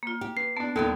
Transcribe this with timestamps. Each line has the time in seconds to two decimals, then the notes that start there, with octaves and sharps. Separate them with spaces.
0.03 A#3 F4
0.21 G4
0.37 B4 C7
0.57 B3 D4 A5
0.76 D#2 A#2 D3 D#3 G3 B3 A4